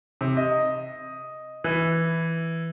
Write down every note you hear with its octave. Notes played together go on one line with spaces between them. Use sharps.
C3
D#5
E3